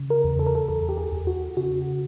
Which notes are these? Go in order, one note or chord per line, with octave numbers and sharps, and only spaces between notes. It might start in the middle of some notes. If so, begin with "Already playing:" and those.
Already playing: C#3
A#4
E2
A4
A#4
A4
E2 A4
G4
G#4
E2
F#4
C#3 F#4